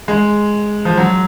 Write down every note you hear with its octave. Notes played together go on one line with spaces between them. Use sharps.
G#3
F3
F#3